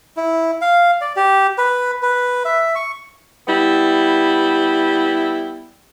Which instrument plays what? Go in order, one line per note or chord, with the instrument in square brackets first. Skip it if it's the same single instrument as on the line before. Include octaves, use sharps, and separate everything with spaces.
[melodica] E4
F5
D5
G4
B4
B4
E5
C#6
[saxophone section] G3 B3 E4